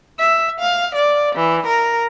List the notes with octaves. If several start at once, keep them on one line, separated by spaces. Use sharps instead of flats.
E5
F5
D5
E3
A#4